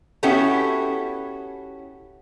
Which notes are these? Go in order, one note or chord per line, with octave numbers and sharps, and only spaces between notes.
B3 C#4 E4 F#4 G4 A4